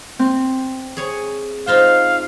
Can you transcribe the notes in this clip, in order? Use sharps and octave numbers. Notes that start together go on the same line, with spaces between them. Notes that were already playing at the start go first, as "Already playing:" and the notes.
C4
G#4 C#5
D#4 F4 C5 F5